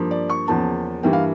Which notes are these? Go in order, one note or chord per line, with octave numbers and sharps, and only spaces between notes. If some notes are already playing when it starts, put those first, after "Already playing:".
Already playing: G2 F3 A#3
D5
C#6
E2 C#3 F3 A#3 A5
G2 E3 G3 A#3 G5
F5